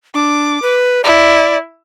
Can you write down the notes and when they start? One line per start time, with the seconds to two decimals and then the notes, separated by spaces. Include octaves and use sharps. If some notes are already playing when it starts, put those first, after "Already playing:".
0.14 D4 D6
0.62 B4
1.04 E4 D5